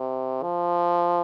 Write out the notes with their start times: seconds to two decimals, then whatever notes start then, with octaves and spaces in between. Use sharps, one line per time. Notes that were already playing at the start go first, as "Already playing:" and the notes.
Already playing: C3
0.42 F3